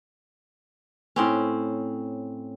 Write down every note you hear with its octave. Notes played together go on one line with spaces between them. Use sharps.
A2 C4 C#4